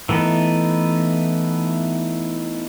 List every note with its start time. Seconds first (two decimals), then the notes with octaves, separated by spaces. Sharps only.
0.09 E3 A3 B3 D#4